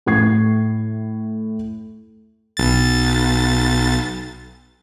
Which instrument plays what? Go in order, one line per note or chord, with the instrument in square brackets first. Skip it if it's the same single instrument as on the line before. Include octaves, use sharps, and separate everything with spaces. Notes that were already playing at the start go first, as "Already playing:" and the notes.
[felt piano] A2 A3 C#6 G#6 C7
[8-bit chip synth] B1 A6